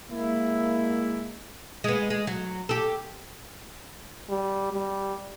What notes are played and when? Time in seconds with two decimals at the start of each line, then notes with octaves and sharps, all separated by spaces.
0.11 G#3 A#3 E4
1.84 G#3 B3
2.10 G#3
2.27 F#3
2.69 G4 A4
4.29 G3
4.73 G3